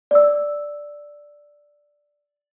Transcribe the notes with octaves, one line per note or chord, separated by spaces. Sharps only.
D5 E6